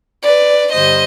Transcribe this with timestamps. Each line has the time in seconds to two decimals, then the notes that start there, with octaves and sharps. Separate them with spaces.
0.23 B4 D5
0.72 G2 D3 G3 C5 D#5